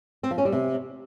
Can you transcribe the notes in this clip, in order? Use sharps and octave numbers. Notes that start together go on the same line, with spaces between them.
C4
F3
C#4
G3
C3